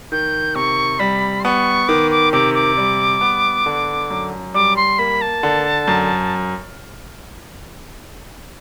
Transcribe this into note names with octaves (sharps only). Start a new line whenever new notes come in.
D#3 G6
C3 C#6
G3 B5
C6
B3 C#6
D#3 D6
D6
C3 D6
D6
G3
B3
D3
F#2
G3 D6
C6
A#3 B5
A5
D3
F#2